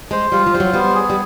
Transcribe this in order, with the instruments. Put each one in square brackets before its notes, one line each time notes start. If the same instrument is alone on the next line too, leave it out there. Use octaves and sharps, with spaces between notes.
[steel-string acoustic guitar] G#3 [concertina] C5
[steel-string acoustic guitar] G3 [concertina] F4
[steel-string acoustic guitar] F3
[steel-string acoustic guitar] G3 [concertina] C5
[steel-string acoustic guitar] F#3
[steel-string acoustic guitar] G3 [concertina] B3
[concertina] G#4
[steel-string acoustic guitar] G3